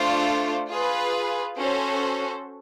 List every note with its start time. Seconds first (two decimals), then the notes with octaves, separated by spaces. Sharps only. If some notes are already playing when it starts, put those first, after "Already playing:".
Already playing: A3 D4 F4 A4 C5
0.69 F4 G#4 B4
1.57 C#4 F#4 A4 C5